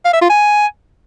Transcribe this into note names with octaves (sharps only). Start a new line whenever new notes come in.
F5
E5
F4
G#5